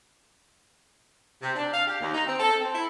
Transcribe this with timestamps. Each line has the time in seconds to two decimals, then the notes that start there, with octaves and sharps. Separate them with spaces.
1.42 C3
1.56 D4
1.73 F5
1.87 G4
2.01 D#2
2.14 D#4
2.26 C4
2.40 A4
2.60 C4
2.75 E4